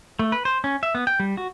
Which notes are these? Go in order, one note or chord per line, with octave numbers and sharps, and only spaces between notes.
A3
B4
C5
C#4
E5
B3
G5
G3
F#4